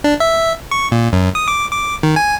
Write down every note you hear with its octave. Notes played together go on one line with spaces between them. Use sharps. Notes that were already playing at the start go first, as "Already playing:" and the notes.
D4
E5
C#6
A#2
F#2
D#6
D6
D6
D#3
G#5